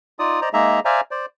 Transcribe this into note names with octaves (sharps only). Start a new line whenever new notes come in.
D#4 F4 D5 D#6
C5 D5 D#5 A#5
G#3 A#3 D#4 G#4 E5 A#5
C5 D5 E5 F5 G#5 A#5
C5 D5